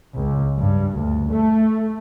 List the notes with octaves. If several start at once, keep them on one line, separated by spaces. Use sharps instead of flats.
C#2
G2
D2
A3